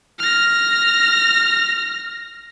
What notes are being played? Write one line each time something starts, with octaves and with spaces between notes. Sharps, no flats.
F6 A#6